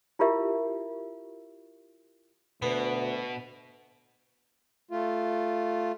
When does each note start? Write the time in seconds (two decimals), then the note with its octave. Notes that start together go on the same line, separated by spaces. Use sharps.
0.19 E4 F4 G4 A#4 E5
2.62 D2 B2 B3
4.91 A3 F4